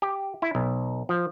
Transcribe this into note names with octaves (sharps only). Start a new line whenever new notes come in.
G4
E4
B1
F3